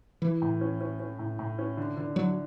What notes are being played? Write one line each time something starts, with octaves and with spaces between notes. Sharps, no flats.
E3 E4
A2
C#4
C#4
C#4
A2
A2
C#4
D3
D3
D3 F#3